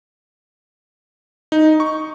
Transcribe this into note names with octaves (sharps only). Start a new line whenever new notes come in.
D#4
C#6